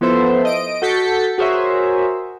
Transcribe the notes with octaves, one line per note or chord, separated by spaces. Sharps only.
F3 B3 E4 A4 C5 E5
D#5 D7
F#4 A4 G6 A6 B6 C#7
F#4 G#4 A#4 C5 C#5 E5